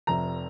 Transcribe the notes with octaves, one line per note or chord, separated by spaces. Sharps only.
F1 F2 C3 A#5